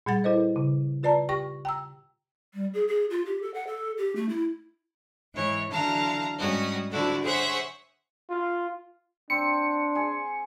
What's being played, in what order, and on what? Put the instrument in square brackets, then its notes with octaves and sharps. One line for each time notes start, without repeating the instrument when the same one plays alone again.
[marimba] A#2 G3 F#5 A6
E4 A4 B4 C5 D#5
C#3
F4 B4 D5 A5 A#5
G4 G5 C#6 A#6
G5 A#5 E6
[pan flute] G3
G#4
G#4
F4
G4
A4
F#5
A4
G4
A3
E4
[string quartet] G#2 E3 C#5
D3 E3 F#3 F5 A5 A#5
G#2 G3 C#4 F#4 D#6
D3 F3 E4 F#4 A4 D5
G#4 C5 C#5 E5 F#5 C#6
[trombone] F4
[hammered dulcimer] C4 [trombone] D4 [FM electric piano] C#7
[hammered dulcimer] G#4